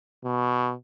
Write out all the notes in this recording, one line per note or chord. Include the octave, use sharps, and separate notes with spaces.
B2